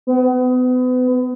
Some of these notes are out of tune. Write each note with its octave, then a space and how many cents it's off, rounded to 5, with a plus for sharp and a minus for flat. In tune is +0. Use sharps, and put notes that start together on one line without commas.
B3 +35